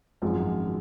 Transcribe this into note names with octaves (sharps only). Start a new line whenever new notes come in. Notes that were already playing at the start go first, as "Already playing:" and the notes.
G#1 F#2 F3 G#3